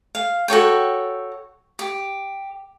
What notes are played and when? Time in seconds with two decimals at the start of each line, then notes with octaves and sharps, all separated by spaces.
0.15 F5
0.48 F#4 A4 C#5 G5
1.79 G4